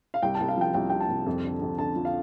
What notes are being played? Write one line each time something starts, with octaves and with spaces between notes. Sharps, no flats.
F5
C2 G5
A5
C2
F5
F3 G5
C2 G5
C3 G5
A5
C2
F2
D3
F2
D3 A5
F3
F5